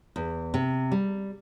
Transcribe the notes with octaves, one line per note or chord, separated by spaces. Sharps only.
E2
C3
G3